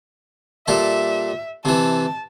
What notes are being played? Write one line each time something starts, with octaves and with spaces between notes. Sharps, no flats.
A#2 G3 A4 E5
C3 E3 A5